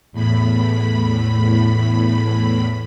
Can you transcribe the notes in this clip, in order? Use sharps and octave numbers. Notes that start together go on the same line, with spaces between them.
E2 A2 B5